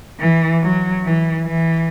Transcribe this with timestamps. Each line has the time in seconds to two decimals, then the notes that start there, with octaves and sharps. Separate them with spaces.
0.20 E3
0.62 F#3
1.04 E3
1.46 E3